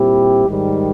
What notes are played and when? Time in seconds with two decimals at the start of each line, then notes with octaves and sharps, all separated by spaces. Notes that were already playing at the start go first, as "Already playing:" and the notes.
Already playing: A#2 G3 C4 E4 G4
0.47 G#2 D#3 G3